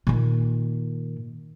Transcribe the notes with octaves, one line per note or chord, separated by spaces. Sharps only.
A#2 D#3